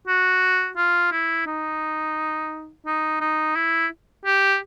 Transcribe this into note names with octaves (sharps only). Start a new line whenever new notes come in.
F#4
F4
E4
D#4
D#4
D#4
E4
G4